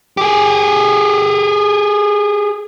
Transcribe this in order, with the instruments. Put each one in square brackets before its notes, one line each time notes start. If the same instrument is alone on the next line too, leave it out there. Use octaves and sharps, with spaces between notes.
[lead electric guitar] G4 G#4